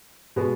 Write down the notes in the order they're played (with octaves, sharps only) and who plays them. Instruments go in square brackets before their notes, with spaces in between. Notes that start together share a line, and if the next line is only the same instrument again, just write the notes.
[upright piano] B2 G#3 B3